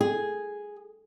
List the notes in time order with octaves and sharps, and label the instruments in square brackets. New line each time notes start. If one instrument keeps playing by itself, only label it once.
[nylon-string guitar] G#4